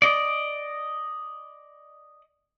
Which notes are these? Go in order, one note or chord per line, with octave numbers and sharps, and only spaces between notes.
D5 D#5